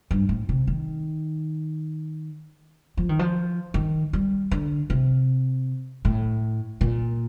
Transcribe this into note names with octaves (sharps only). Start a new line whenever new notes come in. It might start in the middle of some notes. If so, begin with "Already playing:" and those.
G2
A2
C3
D#3
F3
D#3
F3
D#3
G3
D3
C3
A2
A#2